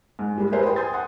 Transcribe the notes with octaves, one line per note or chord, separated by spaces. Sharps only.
G#2
G3 G#3
G4 G#4 B4 C5 E5
B4 G5 C6
G#5 C6 D#6 G6 A6
F#5 C6 D#6